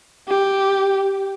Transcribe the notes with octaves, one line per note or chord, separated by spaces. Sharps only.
G4